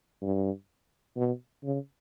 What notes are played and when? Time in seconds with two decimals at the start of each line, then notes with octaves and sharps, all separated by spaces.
0.22 G2
1.17 B2
1.64 C#3